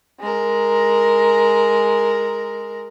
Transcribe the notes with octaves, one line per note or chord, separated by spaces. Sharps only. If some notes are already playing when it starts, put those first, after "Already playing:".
G#3 A#4